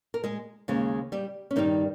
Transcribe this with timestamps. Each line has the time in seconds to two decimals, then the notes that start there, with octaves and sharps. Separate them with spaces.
0.14 A#4
0.24 G#3 G#4
0.68 D#2 C#3 G#3
1.12 G3 G4
1.51 C#4
1.56 G2 D#3 G3 D#4